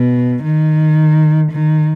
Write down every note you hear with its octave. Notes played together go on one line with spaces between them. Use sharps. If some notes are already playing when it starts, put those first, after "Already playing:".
Already playing: B2
D#3
D#3